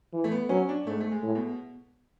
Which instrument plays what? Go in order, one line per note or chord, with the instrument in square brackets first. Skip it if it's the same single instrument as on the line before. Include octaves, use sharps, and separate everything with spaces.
[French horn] E3
[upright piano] A3
B3
[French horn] F#3 [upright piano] C#4
[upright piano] D4
[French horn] G#2 [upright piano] A3
[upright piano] A3
G#3
[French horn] A2
[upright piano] B2